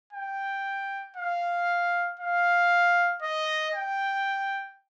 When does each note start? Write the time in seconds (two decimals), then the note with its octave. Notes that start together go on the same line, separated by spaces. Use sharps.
0.13 G5
1.16 F5
2.20 F5
3.22 D#5
3.74 G5